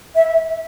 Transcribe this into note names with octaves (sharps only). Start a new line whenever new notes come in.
E5